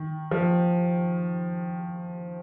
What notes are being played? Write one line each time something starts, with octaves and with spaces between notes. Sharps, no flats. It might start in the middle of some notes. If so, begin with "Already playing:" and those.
Already playing: D#3
F3